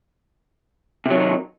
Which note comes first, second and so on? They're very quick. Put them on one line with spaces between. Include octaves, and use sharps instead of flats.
C3 F#3 D#3 D#4